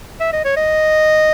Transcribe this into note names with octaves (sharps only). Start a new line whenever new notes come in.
E5
D#5
C#5
D#5